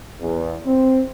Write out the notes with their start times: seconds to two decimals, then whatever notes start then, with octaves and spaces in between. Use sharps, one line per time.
0.21 E2
0.66 C4